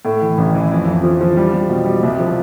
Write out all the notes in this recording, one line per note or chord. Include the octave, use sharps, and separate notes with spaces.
A2
E3
A1
E3
F2
F2
F3
F3
G3
G3
B2
G3
C2
F3